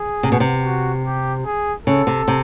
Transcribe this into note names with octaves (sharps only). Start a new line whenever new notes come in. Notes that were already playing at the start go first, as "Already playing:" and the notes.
Already playing: G#4
C3
B2
C3
F#4
G4
G#4
C#3 A4
C3
C3